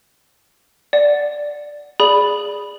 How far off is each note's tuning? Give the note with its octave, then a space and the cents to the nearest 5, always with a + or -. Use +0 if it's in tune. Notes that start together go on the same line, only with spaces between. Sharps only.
D5 +0 F#5 -5
G#4 -5 D5 +0 B5 +0